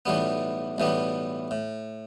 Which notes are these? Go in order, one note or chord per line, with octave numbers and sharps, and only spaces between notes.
B1 A2 E3 G3 B3
B1 A2 E3 G3 B3
A2